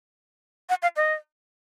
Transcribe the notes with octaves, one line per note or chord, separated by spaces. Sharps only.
F#5
F5
D#5